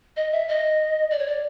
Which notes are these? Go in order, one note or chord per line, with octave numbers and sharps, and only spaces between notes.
D#5
E5
D#5
D5
C#5
D5